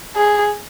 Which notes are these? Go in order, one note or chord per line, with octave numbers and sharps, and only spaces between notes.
G#4